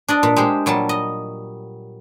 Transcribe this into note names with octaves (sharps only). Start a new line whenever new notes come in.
D4 D5 D#5
A#2
G#3 G4 C5
A#2 F#3 G3 A5
D#5